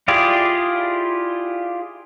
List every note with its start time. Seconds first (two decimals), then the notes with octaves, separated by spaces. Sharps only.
0.08 E4 F4 G4 G#4 D5